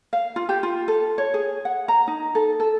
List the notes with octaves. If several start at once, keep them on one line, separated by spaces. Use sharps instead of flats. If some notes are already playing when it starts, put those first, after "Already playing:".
F5
F4
G4
F4
A4
C#5
G#4
F#5
A#5
D#4
A4
A4